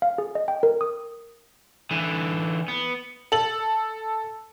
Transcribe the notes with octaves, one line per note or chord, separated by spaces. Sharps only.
F5
G#4
D#5
G5
A#4
D#6
D3 E3
B3
A4 F#7